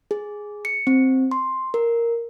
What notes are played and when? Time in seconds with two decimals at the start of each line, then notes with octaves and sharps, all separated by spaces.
0.11 G#4
0.65 C#7
0.87 C4
1.31 C6
1.74 A#4